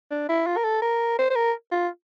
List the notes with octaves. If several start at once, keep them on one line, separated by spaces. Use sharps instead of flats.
D4
E4
F4
A#4
A4
A#4
C5
C5
A#4
F4